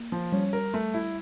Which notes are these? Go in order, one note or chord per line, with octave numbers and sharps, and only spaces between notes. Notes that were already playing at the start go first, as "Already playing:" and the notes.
Already playing: A#3
F3
G3 C#4
A#4
A3
E4